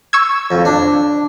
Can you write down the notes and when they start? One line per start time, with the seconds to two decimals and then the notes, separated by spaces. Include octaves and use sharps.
0.13 C#6 E6 G#6
0.51 F2
0.65 D4